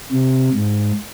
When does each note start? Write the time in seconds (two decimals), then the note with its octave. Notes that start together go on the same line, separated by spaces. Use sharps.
0.12 C3
0.55 G#2